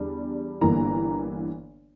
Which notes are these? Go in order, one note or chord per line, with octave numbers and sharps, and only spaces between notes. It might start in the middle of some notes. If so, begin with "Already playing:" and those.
Already playing: E2 D3 G3 D4
G1 G2 E3 A#3 A#5